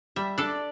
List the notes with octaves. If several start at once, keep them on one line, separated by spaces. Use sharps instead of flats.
G3 E5
D4 A4 D5